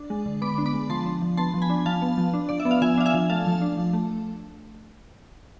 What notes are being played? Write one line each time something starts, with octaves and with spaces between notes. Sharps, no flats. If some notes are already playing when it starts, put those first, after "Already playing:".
Already playing: D4
G#3
D3
B3 B5 D6
D4
B5 D6
G#3
F3 A5 C6
D4
F3
B3 A5 C6
F3
G#5 B5
D4
F3 F5 A5
B3
F3
D4
F3 D5
E5
B3
F5
F3 E5 G#5
D4 F5
E5 G#5
F3
A3 F5 A5
F3
D4
F3
A3